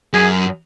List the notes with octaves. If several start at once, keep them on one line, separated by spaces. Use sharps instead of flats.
F#2 G#4